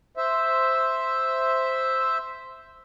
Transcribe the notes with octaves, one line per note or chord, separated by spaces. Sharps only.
C5 E5